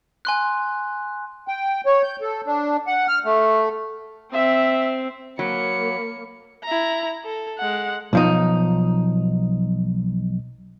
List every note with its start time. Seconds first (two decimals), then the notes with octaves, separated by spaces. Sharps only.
0.25 G#5 C6 F#6
1.48 G5
1.86 C#5
2.03 G6
2.22 A4
2.47 D4
2.87 F#5
3.08 F6
3.25 A3
4.33 C4 E5
5.39 F#3 A#3 B5 C#7
6.64 E4 A#5
7.24 A4
7.58 G#3 F#5
8.13 B1 F3 D#4